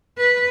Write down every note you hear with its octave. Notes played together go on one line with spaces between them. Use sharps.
B4